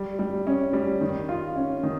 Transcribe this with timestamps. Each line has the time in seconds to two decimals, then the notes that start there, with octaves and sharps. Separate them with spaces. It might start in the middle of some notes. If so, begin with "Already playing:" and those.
Already playing: G3
0.19 G3
0.47 C#4
0.73 G3
1.01 D#3
1.29 F4
1.56 C#4
1.83 D#3